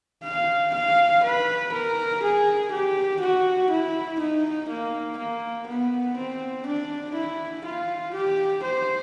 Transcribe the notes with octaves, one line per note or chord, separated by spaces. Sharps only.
F5
F5
B4
A#4
G#4
G4
F#4
E4
D#4
A#3
A#3
B3
C4
D4
E4
F4
G4
C5